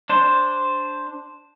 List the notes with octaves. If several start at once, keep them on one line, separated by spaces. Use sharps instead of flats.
D4 C5